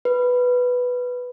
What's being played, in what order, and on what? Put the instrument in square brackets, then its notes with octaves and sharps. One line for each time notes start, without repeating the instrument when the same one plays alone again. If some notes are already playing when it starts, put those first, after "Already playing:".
[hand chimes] B4